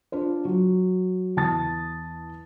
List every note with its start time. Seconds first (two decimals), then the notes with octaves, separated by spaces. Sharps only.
0.12 D4 F4 C5
0.45 F#3
1.37 E2 A5 D#6 A6